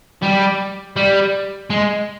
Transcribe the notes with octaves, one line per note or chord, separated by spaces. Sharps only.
G3
G3
G#3